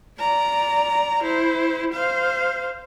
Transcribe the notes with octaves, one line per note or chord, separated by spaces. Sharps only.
D5 A#5
E4 C5
C5 F5